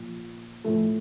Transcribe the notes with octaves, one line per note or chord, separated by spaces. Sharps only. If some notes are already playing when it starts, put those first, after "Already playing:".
Already playing: A#2 F3
A2 F3 A3